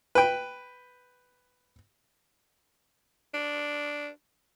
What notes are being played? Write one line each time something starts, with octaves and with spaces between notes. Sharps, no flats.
B4 G5
D4